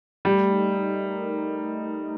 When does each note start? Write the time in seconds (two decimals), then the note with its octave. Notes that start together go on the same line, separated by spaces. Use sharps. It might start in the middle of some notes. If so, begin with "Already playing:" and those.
0.25 G3 A3
0.51 D#4
0.78 A3
1.03 A#4